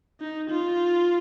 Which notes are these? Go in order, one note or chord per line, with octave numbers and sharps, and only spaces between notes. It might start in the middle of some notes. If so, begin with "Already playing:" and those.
D#4
F4